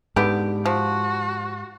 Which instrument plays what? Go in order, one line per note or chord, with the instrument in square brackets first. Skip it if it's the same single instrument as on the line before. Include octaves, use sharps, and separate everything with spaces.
[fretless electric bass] G#2 [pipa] D3 B3 [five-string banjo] G4
[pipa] F3 [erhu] F#4